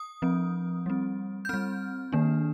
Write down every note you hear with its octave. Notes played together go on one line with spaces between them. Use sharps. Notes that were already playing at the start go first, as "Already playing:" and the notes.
Already playing: D#6
F3 C4
G3 C4
G6
G3 C4 F6
D#3 A#3 D4